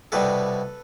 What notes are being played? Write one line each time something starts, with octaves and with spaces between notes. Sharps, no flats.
C2 B2 G3 A4 B4